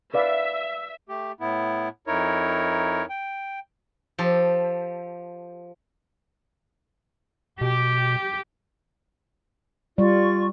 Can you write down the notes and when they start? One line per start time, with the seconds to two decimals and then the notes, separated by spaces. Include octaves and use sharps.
0.14 B4 D5 E5 F5
1.09 A3 G4
1.40 A2 B3 E4
2.07 F2 D#4 E4 A#4 C#5
3.10 G5
4.19 F3 G4 A4
7.61 B2 G4
9.98 G3 F4 D5 C#6